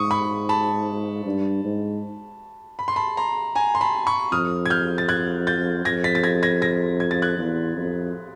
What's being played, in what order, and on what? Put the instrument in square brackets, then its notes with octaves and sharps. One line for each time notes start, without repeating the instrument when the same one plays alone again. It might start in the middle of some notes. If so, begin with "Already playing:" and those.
Already playing: [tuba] G#2 [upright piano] C#6 D#6
[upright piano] B5 C#6
A5 B5
[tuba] G2
G#2
[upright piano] B5
C6
A5 B5
A#5 C6
G#5 A#5
C6
A5 B5
B5 C#6
[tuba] F2 [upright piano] D#6 F6
[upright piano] G#6
F6 G6
A6
F#6 G#6
G6 A6
[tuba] F2 [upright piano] G#6 A#6
[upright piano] A6 B6
A6
G#6 A#6
G#6 A#6
G#6 A#6
G#6
A6
F#6 G#6
[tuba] E2
F2